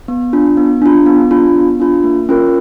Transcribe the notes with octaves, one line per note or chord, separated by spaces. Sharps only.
B3
D4 F4
B3
D4 F4
B3
D4 F4
B3
D4 F4
A#3
C#4 F4 A#4